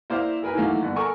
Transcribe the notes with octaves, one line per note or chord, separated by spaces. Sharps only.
A#3 E4 C5 D5 F5
G#4 A#4 B4 G#5
D#3 E3 F#3 A3 A#3
G1 F#5
A4 A#4 G#5 C#6